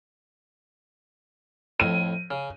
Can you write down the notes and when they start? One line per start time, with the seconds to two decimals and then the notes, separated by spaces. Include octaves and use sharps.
1.80 F2 A2 D#7
2.31 C#3